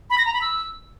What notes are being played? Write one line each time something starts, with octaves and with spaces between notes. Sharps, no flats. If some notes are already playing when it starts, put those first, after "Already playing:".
B5
A#6
A#5
B5
E6